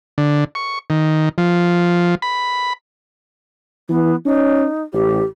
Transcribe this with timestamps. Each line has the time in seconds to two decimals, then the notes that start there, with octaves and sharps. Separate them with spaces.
0.18 D3
0.55 C#6
0.90 D#3
1.38 F3
2.22 B5
3.89 E3 B3
4.25 C#4 D#4
4.93 A1 G4